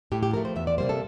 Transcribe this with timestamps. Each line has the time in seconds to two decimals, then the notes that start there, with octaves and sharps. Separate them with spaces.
0.12 A2 G4
0.23 G4
0.34 F3 A3 A#4
0.45 C5
0.56 E2 E5
0.67 D5
0.78 C3 G3 A#3 C5
0.89 A4